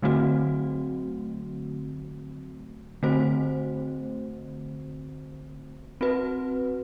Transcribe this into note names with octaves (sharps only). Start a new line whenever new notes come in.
D3 F#3 A3 C4 F#4
D3 A3 C4 F#4 C5
C4 F#4 B4